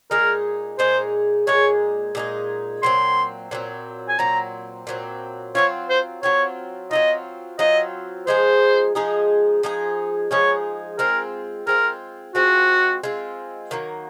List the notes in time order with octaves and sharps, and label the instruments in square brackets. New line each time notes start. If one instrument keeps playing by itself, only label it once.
[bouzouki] A#2 G#3 D#4 G#4 [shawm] A#4
[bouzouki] A#2 G#3 D#4 G#4 [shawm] C5
[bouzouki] A#2 G#3 D#4 G#4 [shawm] C#5
[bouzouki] A#2 G#3 D#4 G#4
[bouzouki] A#2 F#3 C4 [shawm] C6
[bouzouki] A#2 F#3 C4
[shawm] G#5
[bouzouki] A#2 F#3 C4 [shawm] A#5
[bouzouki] A#2 F#3 C4
[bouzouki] F#3 C4 F4 [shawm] C#5
[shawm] C5
[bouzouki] F#3 C4 F4 [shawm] C#5
[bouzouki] F#3 C4 F4 [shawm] D#5
[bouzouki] F#3 C4 F4 [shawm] D#5
[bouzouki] F3 G#3 D#4 G#4 [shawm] C5
[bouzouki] F3 G#3 D#4 G#4
F3 G#3 D#4 G#4
[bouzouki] F3 G#3 D#4 G#4 [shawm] C#5
[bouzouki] G#3 C4 F4 [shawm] A#4
[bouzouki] G#3 C4 F4 [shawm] A#4
[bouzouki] G#3 C4 F4 [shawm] F#4
[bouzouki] G#3 C4 F4
D#3 F#3 A#3